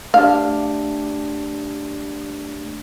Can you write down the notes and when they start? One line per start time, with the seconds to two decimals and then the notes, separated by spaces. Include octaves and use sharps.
0.14 A3 D4 G4 F5